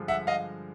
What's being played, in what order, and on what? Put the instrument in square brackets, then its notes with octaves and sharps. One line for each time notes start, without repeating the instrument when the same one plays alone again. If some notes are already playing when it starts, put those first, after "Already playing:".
Already playing: [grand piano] G2 D3 F3 G#3
E5 F#5
D#5 F5